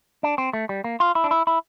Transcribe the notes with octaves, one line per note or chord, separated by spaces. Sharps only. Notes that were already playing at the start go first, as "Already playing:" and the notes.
D4
C4
A3
G3
A#3
F4
E4
D4
E4
E4